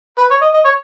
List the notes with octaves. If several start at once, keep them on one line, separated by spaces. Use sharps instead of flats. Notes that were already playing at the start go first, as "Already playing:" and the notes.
B4
C#5
D#5
D#5
C#5